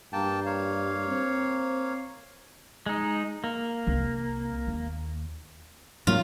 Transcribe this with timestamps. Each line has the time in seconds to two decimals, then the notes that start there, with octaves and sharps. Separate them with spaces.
0.13 G2 A#3 G5 A5
0.46 A#3 C#5 F5
1.09 C4
2.86 G#3 D#4
3.44 A#3
3.87 C2 C4
4.67 D#2
6.07 G#2 F#3 A#3 F4